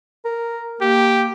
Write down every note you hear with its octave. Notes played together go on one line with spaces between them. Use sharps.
A#4
A#3 G4